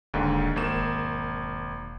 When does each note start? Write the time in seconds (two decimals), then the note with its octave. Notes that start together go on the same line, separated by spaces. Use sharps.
0.14 D#1 D#2 G#2 D3
0.56 G#1 A#3 E7
0.76 E1